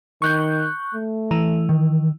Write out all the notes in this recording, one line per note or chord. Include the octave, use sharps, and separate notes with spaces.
D#3 C#6 F#6 G6
A3
E3 A#5
D#3